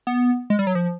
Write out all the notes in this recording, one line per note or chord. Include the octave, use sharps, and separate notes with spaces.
B3
G#3
G3
F#3
F3